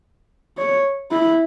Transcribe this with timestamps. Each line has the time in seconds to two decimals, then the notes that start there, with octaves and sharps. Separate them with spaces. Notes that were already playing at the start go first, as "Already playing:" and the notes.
0.58 C#5
1.11 E4